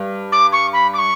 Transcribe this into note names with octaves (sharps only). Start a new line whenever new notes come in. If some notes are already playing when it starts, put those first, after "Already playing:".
Already playing: G2
D6
C#6
B5
D6
C#6